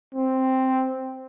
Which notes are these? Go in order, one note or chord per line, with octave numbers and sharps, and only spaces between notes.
C4